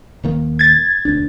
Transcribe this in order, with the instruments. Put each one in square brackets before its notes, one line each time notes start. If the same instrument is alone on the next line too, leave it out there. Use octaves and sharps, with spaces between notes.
[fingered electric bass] D#1 D#3 A#3
[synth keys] G#6 A6
[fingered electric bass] E1 D2 D4